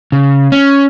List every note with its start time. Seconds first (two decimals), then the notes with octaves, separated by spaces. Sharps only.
0.12 C#3
0.52 C#4